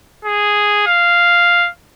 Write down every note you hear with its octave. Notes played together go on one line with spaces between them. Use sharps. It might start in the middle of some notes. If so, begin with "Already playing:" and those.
G#4
F5